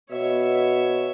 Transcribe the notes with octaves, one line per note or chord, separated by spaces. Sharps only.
B2 C#5 E5